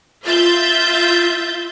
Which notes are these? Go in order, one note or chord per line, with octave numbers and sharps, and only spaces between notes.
F4 E5 G6 A6